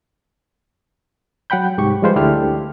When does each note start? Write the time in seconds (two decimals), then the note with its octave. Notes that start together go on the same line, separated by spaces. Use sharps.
1.50 F#3 F#5 G5 B5 G6
1.78 C2 G#2 G4 C#6
2.02 F3 G3 G#3 F4 B4 C5
2.16 D2 D4 E4 G4 A4 F6